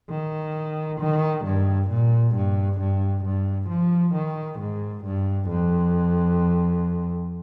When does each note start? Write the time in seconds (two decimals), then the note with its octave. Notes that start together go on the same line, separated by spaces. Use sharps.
0.10 D#3
1.00 D#3
1.45 G2
1.90 A#2
2.35 G2
2.80 G2
3.24 G2
3.69 F3
4.14 D#3
4.59 G#2
5.05 G2
5.49 F2